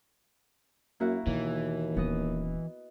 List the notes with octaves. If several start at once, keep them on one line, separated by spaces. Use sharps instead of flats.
F#2 A#3 E4 F#4
D#2 B2 E3
D#1 B3 C#4 D#5